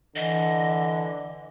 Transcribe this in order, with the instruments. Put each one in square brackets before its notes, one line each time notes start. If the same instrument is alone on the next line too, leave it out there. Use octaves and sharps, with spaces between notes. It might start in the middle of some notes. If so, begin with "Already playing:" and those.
[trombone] D3 [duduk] E3 [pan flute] D#5